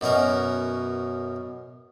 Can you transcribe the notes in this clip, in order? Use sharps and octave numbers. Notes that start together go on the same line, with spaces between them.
F#2 B2 C#4 A#4